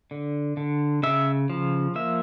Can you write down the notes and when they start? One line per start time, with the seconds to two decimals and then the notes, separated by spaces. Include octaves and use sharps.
0.11 D3
0.57 D3
1.03 C#3 E5
1.50 F3
1.95 A#3 E5